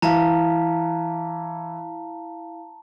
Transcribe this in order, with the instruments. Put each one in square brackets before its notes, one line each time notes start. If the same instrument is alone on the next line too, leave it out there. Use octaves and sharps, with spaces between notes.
[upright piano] E3 [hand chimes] E4 F5 [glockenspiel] A5 A#5